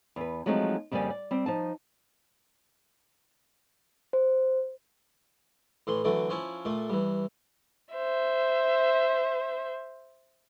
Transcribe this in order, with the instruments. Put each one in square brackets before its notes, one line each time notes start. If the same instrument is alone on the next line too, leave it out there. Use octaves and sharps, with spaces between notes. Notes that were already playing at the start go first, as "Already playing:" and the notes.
[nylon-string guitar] E2 B4
F3 F#3 G#3 A3 C4 D#4
F2 C#3 G3 A#3 D5 G#5
D5
G3 C4
F3 D#4 A5
[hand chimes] C5
[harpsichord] A2 E3 C6
D3 E3 F#3 A3
F3 C#4 E4
A#2 A3
G2 E3
[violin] C5 E5